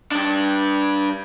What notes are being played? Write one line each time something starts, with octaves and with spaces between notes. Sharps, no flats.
G2 D4